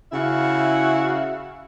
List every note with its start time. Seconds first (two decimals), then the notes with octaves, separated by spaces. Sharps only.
0.12 C#3 E4 F#4 E5 F5